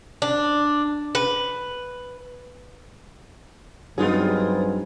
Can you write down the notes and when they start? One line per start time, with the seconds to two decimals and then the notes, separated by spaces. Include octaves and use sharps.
0.22 D4
1.15 B4
3.98 G2 F#3 B3 C4 D#4 F4 G#4 B4